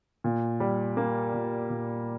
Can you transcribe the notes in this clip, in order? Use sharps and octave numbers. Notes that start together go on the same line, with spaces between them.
A#2
G3
A#3
A#2
A#2